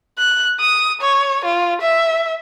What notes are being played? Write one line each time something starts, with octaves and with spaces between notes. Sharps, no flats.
F#6
D#6
C#5
F4
E5